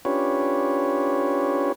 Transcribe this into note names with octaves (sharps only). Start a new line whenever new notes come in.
C#4 D4 F4 G4 B4 C#5